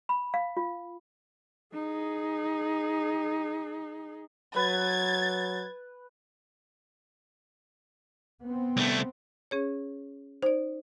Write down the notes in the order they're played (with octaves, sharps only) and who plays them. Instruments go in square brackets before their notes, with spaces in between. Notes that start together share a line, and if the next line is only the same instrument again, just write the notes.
[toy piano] B5
F5
F4
[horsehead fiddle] D#4 G#4
[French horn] F#3 [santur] B4 [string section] G#6 A6
[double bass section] B3 C4
[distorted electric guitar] C2 A3
[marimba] C#4 G#4 C#5
[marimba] D#4 D5 [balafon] C5